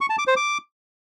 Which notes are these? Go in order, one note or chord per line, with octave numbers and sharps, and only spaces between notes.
C#6
A5
D6
C5
D6